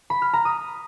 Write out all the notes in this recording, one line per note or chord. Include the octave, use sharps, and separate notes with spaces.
B5
F6
A#5
D#6